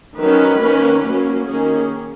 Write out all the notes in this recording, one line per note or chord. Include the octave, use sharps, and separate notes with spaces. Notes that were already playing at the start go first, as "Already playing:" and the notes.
D#3 F#3 C#4 B4
D#3 A#3 C#4
F#3 A#3 C#4
D#3 A#3 C#4 G#4